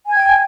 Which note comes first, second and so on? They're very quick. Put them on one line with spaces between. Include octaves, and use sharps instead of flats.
G#5 G#6 G5